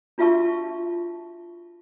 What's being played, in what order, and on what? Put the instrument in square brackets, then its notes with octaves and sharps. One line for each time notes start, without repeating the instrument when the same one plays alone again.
[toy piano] D4 F4 F#4 E5 A5 C#6